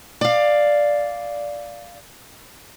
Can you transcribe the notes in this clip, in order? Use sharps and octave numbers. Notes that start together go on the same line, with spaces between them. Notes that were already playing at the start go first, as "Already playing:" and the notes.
D5 F5